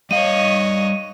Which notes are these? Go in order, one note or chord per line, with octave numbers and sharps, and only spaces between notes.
G3 C#5 D#5 F5 D#7